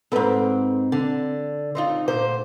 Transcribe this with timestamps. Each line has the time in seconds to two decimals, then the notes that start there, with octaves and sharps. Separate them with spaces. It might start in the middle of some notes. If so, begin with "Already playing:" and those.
0.12 E2 G#2 C4 A4 B4
0.92 D3
1.75 C4 D#4 F4
2.08 A#2 D3 C5